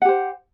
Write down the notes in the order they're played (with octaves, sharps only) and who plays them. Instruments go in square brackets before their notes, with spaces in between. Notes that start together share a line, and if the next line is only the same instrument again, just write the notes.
[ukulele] F#5
G4
C5